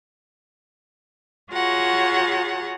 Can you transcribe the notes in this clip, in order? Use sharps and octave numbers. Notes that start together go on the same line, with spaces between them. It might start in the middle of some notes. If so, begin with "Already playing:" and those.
F4 F#4 G#4 C#5 F#5 A#5